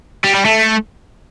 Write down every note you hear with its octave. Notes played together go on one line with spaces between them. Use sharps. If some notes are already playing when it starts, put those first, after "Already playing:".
G3
G3
A3